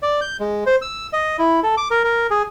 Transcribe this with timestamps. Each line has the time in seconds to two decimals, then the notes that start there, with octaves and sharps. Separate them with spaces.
0.03 D5
0.21 G6
0.40 G#3
0.66 C5
0.82 E6
1.13 D#5
1.39 E4
1.63 A4
1.77 D6
1.91 A#4
2.04 A#4
2.30 G#4